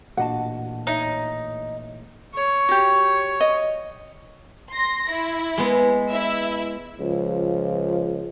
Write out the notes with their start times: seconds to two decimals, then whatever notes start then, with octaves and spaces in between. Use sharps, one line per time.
0.17 A1 A#2 A#3 D4 F#4 D#5 F#5 A5
0.87 D#4 C#5 D#5 E5
2.34 C#5
2.69 F#4 G4
3.41 D#5
4.71 C6 A#6
5.11 E4
5.58 G#3 B3
6.08 E4 E5
7.00 C#2 F3